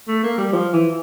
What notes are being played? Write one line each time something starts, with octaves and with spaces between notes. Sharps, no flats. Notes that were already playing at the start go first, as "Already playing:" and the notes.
A3
A#3
G3
F3
E3